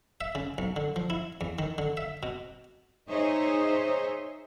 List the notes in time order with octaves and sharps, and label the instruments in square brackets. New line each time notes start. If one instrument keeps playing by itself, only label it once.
[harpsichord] E5
C#3
B1
D3
F3
E4
E2
D#3
D3
E5
B2
[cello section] D#4 G#4 C5 C#5 D#5 E5